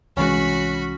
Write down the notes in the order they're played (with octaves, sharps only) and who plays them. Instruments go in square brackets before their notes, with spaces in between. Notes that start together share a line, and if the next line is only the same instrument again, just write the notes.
[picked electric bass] C2 E3 G#3 [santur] C#4 [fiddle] F#4 B5